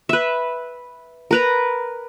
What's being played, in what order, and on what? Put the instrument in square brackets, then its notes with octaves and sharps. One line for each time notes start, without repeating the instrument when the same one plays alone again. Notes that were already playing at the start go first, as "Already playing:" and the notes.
[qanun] B4 E5
A#4 B4 A#5